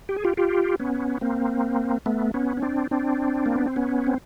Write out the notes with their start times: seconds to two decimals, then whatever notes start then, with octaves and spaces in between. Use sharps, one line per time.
0.09 G4
0.16 G#4
0.25 F4 G4
0.37 F4 G4
0.80 B3 C#4
1.21 A#3 C4
2.06 A3 B3
2.34 B3 C#4
2.57 C#4
2.62 C4 D4
2.91 C4 D4
3.46 A#3
3.56 B3
3.66 C4
3.76 B3 C#4
4.07 C4